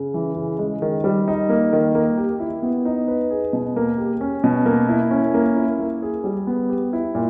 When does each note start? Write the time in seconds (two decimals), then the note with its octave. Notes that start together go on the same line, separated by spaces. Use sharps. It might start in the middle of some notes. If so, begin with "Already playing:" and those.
Already playing: C#3
0.14 E3
0.36 C#3
0.59 G#3
0.82 D#3
1.04 G3
1.28 D#4
1.49 A#3
1.73 D#3
1.95 A#3
2.17 G4
2.40 E4
2.62 B3
2.85 D#4
3.08 B4
3.30 G#4
3.53 B2
3.76 A#3
3.98 G4
4.21 C#4
4.44 B2
4.66 A#3
4.88 E4
5.11 C#4
5.34 A#3
5.56 E4
5.79 A#3
6.02 G#4
6.24 G3
6.47 B3
6.70 G4
6.93 E4
7.15 A#2